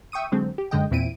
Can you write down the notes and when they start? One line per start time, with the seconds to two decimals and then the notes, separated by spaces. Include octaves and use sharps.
0.12 E5 G5 C#6 D#6 D#7
0.32 D3 F#3 G#3 C4
0.58 G4
0.71 F#2 D3 G#3 D#5 G5
0.91 E2 A#2 C4 E4 D7 D#7